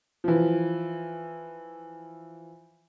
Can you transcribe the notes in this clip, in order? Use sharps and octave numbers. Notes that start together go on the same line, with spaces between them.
E3 F3